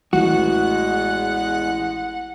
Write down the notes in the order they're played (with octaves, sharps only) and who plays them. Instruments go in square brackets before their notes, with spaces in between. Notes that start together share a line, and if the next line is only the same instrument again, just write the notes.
[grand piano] A1 [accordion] E2 G#3 F#6 [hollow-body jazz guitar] F#4 [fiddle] F#5